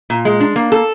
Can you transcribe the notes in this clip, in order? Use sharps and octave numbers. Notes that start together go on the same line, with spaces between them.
A#2
G#3
D4
A#3
A4